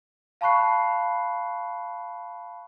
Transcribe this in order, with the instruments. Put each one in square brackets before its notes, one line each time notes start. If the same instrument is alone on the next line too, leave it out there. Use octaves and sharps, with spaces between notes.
[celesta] F5 A5 B5 C#6 F#6 C7